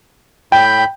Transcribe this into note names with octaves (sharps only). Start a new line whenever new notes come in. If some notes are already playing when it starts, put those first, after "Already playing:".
A2 G5 B5 G6